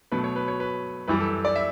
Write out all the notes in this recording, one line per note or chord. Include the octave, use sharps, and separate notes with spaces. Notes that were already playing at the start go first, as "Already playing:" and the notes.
B2 F#3 A3 B4
C#5
B4
C#5
B4
F#2 E3 G3 B4
A4
D5
E5